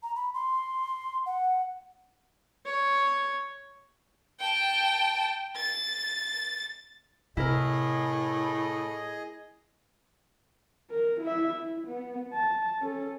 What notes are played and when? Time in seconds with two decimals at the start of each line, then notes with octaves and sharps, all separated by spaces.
0.03 A#5
0.16 B5
0.34 C6
1.26 F#5
2.65 C#5
4.41 G5 A5
5.56 A6
7.37 A2 C3 E4 G#4 A#4 D#5
10.90 A#4
11.21 E4 E5
11.54 E4
11.87 B3
12.33 A5
12.81 C#4 A4